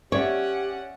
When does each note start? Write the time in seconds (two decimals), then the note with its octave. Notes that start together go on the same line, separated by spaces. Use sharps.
0.12 C#4 G4 C#5 D5 E5 F#5